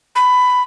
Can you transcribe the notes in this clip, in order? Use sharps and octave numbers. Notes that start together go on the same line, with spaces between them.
B5